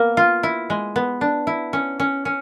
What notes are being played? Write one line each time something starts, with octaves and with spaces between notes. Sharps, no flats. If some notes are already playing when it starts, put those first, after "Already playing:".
Already playing: A#3 B3
F4
E4
G#3
B3
D4
E4
C#4
C#4
C#4